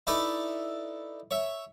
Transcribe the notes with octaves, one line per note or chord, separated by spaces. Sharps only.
D#4 E4 A4 B4 D5
C#5 E5